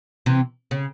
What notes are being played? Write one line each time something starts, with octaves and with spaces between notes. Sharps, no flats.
C3 E3
C#3